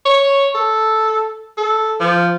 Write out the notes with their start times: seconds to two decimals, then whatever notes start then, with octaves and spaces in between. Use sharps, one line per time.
0.05 C#5
0.55 A4
1.57 A4
2.00 F3